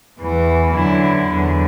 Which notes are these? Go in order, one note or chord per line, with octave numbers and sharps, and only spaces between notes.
E2 E3
F#2 D3 F#3 E4
E2 D3 F#3